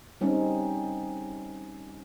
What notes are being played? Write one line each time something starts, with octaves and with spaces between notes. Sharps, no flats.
G3 C4 C#4 D#4